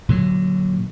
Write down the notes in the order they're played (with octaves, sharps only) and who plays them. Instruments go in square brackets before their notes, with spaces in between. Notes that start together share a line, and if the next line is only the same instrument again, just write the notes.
[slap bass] A#2 D3 F#3